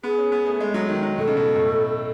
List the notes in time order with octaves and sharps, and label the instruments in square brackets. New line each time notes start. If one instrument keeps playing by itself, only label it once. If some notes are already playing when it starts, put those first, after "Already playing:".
[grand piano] B3 [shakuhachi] G#4
[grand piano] C#4
B3
A3
G#3
F#3
D#3
F#3
[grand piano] B2 [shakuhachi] A4
[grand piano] C#3
B2
A2